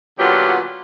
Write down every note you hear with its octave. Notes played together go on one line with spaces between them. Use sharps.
A#2 D3 F#3 B3 F4 G4